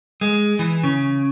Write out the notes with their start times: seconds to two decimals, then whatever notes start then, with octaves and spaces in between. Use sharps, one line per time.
0.21 G#3
0.59 E3
0.83 C#3